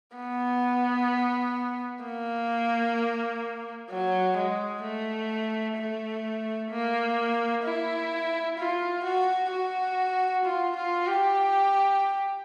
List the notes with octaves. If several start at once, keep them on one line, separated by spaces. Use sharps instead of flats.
B3
A#3
F#3
G#3
A3
A3
A#3
E4
F4
F#4
F#4
F4
F4
G4